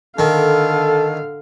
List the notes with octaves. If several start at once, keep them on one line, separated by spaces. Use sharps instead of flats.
D3 D#3 A4 F5